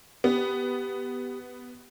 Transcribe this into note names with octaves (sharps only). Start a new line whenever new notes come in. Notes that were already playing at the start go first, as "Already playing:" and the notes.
B3 G4